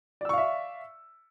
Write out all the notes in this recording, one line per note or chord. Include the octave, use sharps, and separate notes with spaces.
D5 E5 F5 C#6 E6